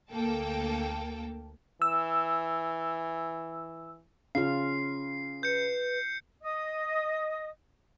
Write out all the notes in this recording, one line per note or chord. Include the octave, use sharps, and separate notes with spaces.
D2 A#3 A4 G5 A5
E3 E6
C#3 F4 F5 C7
B4 G6 C#7
D#5 D#6